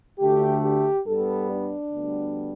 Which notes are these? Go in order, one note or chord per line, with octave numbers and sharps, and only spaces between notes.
D2 D3 A3 G4
G4
G2 G3 B3 A4
D4
D2 D3 G3 B3